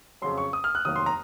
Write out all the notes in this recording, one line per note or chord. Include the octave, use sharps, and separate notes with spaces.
F2 C#3 F#3 C6
C#6
D#6
F6
F#6
F1 D#2 D#3 F#3 D#6
C6
A#5